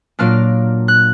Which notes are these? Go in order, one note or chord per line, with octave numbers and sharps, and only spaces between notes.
A#2 F#3 A#3 D4 F6
F#6